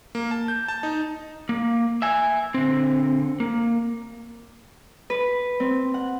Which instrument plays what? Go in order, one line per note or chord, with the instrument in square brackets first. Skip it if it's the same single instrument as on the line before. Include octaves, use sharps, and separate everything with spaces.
[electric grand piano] A#3
A5
G6
A5
D#4
[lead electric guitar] A#3
E5 G#5
D3 C4
A#3
[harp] B4
C4
F#5